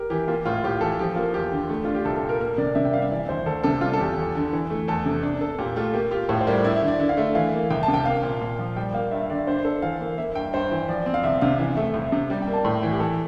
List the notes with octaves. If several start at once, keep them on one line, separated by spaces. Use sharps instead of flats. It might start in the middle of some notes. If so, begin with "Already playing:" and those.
Already playing: G4 A#4
E3 G4
A#3 F4
A2 F4
A2 G4
E3 A4
F3 G4
A#3 F4
E2 G4
D3
A3
D4 F4
G4
C2 A4
A4
A#2
A#4
A#3 A#4
C3 D5
C3 E5
G5
G3 F5
E5
E3 D5
D2 C5
D2 A4
C3 A4
G3 F4
A4
E2 G4
E2
D3
E3
A3
E2 A4
C3
D4
A4
A#2 G4
A3 F4
A#3 G4
F4 G4
A2 A4
C5
G3 A#4
E4 D5
E5
D3
D5
D3 E5
F5
A3 E5
E3 F5
A#3
C2 G5
A5
C3
G5
A#3 F5
A#2
A#2
F3
G3 G5
A#3 F5
G2 E5
E5
D3 D5
D4 C5
A4
E3 F5
A#3
A#3 E5
G2 G5
G2 C5
E3
F3 D5
C4
F5
C2 E5
C3 F5
E3 E5
A3 E5
C2
C3
G3 D5
G5
A#3
A5
A2 G5
E3 G5
G4
E3 A4